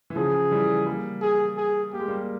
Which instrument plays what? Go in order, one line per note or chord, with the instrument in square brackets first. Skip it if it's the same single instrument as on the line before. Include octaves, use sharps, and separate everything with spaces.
[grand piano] E3
[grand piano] C#3 F3 [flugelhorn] G#4
[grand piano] E3 G3
G3 A#3
[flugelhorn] G#4
G#4
[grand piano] A#3 [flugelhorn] G4
[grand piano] G#3
G3 A#3